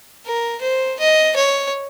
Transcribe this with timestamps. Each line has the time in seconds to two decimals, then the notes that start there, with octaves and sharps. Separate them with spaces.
0.25 A#4
0.61 C5
0.99 D#5
1.36 C#5